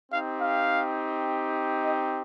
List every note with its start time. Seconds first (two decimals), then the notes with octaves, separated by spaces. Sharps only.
0.11 C4 D#4 G4 F5
0.39 F5
1.82 D#5